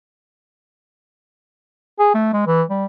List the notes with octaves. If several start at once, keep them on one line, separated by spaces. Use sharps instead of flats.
G#4
A3
G#3
E3
G3